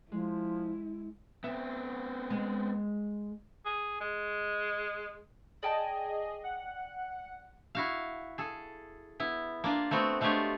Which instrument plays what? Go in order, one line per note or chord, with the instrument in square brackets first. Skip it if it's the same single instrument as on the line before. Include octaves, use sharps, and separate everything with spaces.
[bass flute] F3 [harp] G#3 [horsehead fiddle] E4
[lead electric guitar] B3 C4 [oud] E5
[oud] G#3
[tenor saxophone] G#4
G#3
[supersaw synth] G#4 D#5 [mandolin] D5 G5 A5
[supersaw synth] F#5
[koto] E4 F#4 F5
G#4 A4
B3 E4
A#3 D4 F4
A3 B3 C4 F#4
G#3 A3 D4 F4 G4 C#5